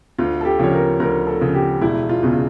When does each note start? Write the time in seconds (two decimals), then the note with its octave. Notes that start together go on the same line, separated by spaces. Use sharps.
0.18 D2 F4
0.41 A4
0.45 G4
0.59 C#3 F3 C#5
0.73 A#4
1.00 D2 A#4
1.27 A4
1.41 C#3 F3
1.54 G4
1.81 E1 E4
2.09 F4
2.22 E2 C#3